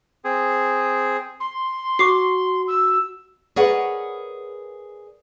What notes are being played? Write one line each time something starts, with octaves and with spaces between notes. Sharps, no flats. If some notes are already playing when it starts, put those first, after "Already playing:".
C4 G#4
C6
F#4 C#6 D6 C7
E6
G#4 A#4 B4 C#5 D5 F#5